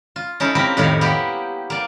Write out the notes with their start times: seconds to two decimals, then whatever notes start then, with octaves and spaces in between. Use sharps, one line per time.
0.16 F4
0.40 C#4 D#4 E4 A4
0.55 A#3 C4 E4 G4 A#4
0.77 F2 A2 D#3 E4 C#5 F5
1.01 A#3 B3 E4 G4
1.70 A#3 D5